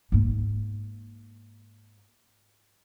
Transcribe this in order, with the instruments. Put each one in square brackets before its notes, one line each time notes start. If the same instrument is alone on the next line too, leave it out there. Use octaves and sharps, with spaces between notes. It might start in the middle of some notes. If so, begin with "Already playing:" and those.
[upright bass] G#2 A#3